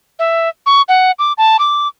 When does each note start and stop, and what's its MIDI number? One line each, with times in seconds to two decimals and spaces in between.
0.19 0.49 76
0.66 0.82 85
0.88 1.11 78
1.19 1.33 86
1.38 1.57 81
1.59 1.88 86